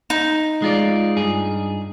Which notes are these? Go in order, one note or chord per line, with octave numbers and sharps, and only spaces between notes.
D#4
G#3 F4 D5
G2 G#4